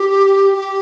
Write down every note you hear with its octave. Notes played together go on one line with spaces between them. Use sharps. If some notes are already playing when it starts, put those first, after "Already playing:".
Already playing: G4
G4